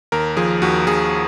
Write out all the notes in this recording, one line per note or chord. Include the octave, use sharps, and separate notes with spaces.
D#2 A#4
F3 G#4
D#2 F#4
D#2 G#4